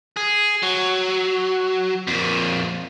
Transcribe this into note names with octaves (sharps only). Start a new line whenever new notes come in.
G#4
F#3
F2 A#2